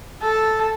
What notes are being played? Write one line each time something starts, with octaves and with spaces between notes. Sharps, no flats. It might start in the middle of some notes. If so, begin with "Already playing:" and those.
A4